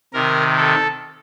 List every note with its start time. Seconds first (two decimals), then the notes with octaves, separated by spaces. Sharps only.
0.13 C3 D#3 A#4
0.57 A4